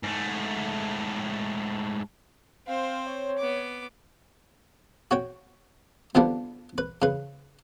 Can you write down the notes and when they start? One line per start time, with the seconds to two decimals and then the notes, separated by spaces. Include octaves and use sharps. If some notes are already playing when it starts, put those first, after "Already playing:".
0.03 G#2 A3
2.67 C4 C5 F5
3.07 C#5
3.38 B3 D6
5.11 F#4 C#5 G5
6.15 F2 D3 F3 G3 B3 D4
6.78 B4
7.02 C#3 B4